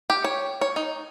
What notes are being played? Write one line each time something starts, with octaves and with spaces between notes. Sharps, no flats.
G4
C#5
C#5
D#4